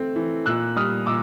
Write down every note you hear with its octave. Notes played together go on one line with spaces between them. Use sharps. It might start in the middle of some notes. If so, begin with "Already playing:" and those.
Already playing: A3 C4
E3
A#2 E6 F#6
G3 D#6 F6
A#2 D6 E6